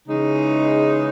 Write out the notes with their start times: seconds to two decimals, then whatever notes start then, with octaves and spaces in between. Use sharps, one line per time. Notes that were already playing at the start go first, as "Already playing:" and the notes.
0.08 C#3 E3 G#3 D#4